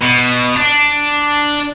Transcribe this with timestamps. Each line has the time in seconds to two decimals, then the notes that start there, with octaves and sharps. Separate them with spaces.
0.01 B2
0.56 D4